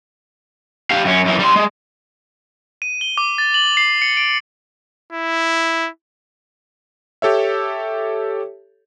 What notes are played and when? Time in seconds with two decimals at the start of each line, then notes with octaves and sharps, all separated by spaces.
0.91 G4 F5
1.05 F#2 C#4
1.25 F#2 E3
1.39 G3 C6
1.56 G#3
2.82 D#7
3.01 G7
3.18 D6
3.38 A6
3.54 F#7
3.77 C7
4.02 C#7
4.17 D7
5.12 E4
7.22 G4 A4 C#5 E5